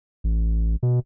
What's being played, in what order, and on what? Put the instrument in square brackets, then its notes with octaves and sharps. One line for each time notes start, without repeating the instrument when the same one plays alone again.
[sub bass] A1
B2